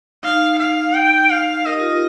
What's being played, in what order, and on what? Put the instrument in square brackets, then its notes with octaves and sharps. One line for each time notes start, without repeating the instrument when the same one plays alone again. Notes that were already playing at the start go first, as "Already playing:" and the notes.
[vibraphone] D#4 [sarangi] F5
[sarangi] F5
G5
F5
[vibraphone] A#4 [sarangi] D#5
[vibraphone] G4
F4
G4